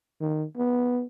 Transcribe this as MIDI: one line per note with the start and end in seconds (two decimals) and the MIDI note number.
0.20 0.44 51
0.57 1.04 59